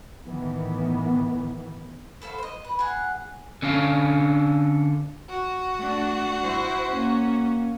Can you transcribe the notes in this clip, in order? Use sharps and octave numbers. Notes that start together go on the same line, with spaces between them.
A2 D#3 E3 B3
B3 A4 C5 F5
C5 D#5
B4
G#4 F#5
D3 C#4 D4 F5
F#4
A3 D4
E4 C5
A#3 C#4